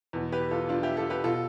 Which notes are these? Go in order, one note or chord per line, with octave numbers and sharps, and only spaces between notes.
E2 B2
G4 B4
F4 A4
D4 F4
E4 G4
F4 A4
G4 B4
B2 F4 A4